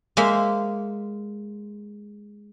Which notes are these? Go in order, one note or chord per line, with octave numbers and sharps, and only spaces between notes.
G#3 A#3 C5 E5